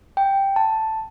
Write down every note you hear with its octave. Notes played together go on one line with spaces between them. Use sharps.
G5
A5